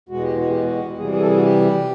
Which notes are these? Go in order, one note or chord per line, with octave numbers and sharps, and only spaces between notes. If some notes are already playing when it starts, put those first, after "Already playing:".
E2 B2 G#3 F#4
G4
F#4
G4
F#4
C3 E3 G3 G#4
G#4
A4
G#4
F#4
G4